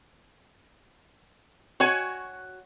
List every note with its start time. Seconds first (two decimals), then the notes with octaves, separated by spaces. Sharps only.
1.80 F#4 C#5 G#5